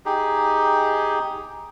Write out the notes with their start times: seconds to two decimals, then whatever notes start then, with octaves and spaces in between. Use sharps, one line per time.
0.06 D#4 G4 G#4